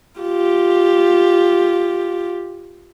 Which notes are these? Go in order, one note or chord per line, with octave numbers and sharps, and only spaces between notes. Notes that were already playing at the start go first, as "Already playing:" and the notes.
F4 G4